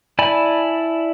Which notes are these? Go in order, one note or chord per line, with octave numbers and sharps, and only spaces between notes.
E4 D5 G#5 A5 B5